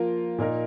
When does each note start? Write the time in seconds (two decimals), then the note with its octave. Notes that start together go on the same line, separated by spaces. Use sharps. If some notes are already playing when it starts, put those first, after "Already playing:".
Already playing: F3 A#3 F4 A#4
0.38 A#2 A#3 D#4 A#4